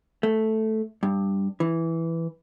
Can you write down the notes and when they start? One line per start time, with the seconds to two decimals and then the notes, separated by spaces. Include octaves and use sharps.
0.23 A3
1.03 G2
1.60 E3